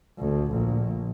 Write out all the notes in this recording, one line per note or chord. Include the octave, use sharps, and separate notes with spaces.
D2
A#1